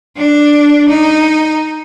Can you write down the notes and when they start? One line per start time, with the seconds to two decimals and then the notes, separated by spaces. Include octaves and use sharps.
0.17 D4
0.88 D#4